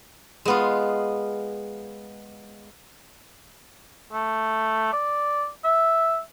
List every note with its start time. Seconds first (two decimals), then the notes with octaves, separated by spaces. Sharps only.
0.45 G#3 B3 F4
4.12 A3
4.93 D5
5.64 E5